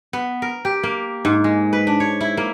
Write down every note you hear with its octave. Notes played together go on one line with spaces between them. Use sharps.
B3
A#4
G4
A#3
G#2
G#3
B4
D4
C#5
E4
A#3